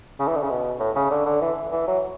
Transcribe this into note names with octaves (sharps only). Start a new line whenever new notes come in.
C#3
E3
D3
C#3
B2
A2
C#3
D3
D3
E3
E3
F#3